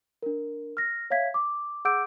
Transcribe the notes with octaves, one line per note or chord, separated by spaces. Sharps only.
D4 A#4
F6 A#6
C#5 E5 F5 G#6 B6
D6
G#4 F#5 D6 E6 G6 D7